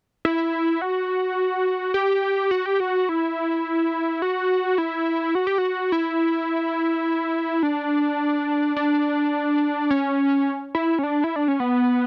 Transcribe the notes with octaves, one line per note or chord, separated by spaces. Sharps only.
E4
F#4
G4
F#4
G4
F#4
E4
F#4
E4
F#4
G4
F#4
E4
D4
D4
C#4
E4
C#4
D4
E4
D4
C#4
B3